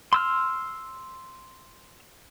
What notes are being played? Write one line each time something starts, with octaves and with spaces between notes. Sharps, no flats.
C6 E6 F6